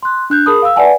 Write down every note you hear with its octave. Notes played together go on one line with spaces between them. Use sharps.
C6 F#6
D4 F#6 G6
G#4 A#4 A5 B5 D#6
F5 E6
B4 D5 E5 F#5 G#5 A5